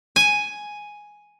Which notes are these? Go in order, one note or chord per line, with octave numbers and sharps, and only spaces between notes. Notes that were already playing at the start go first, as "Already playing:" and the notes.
G#5